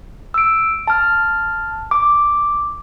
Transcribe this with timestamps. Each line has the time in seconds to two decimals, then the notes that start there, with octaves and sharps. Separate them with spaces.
0.34 E6 D7
0.87 A5 F6
1.91 D6